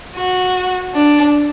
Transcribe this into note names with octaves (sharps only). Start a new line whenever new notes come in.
F#4
D4